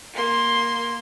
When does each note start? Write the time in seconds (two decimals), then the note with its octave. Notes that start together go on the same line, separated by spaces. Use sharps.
0.14 A#3 C6